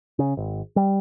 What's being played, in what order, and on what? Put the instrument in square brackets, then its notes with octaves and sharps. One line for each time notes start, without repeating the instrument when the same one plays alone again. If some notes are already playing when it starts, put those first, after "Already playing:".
[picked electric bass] C#3
G#1
G3